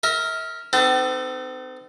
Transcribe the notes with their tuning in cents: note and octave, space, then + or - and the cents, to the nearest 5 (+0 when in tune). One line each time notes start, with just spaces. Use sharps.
A#4 -10 E5 -35
C4 -40 D#4 -30 A4 +15